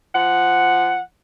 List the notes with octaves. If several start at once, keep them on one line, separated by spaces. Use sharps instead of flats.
F3 F#5